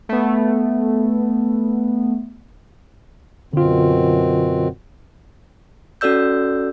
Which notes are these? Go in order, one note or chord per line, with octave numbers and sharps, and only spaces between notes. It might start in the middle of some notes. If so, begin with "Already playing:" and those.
A3 B3
F#2 B2 D3 C4 F4
C#4 F#4 A4 D5 E6 G6